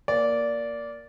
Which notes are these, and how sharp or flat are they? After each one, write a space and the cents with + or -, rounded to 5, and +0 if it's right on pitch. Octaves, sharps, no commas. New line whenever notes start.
A#3 +0 D5 -15